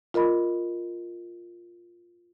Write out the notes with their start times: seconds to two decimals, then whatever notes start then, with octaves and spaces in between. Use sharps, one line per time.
0.14 F4 A#4 D#5 B5